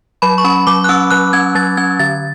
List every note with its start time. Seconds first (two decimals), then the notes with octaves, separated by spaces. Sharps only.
0.22 F#3 B5
0.38 C#6
0.44 C#4 B5
0.67 F#3 D6
0.84 F#6
0.89 C#4 E6
1.10 F#3 F#6
1.33 C#4 G#6
1.55 F#3 A6
1.77 C#4 G#6
1.99 D3 A6